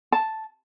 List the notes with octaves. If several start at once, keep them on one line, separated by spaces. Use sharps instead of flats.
A5